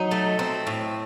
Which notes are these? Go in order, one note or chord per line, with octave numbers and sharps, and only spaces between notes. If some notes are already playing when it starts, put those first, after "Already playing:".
Already playing: F#3 D#4
A3
C4
A2